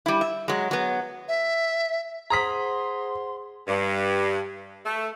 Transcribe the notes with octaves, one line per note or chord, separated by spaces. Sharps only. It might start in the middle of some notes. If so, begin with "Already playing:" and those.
G3 E4
E5
F#3 G#3
F#3 B3
E5
G#4 C5 F#5 A#5 C6 D#6 B6
G2
A3